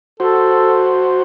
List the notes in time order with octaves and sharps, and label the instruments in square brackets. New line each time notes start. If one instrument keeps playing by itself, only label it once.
[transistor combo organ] F#4 C5 [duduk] A4